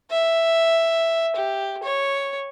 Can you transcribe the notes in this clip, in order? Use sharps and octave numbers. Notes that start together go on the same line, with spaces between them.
E5
G4
C#5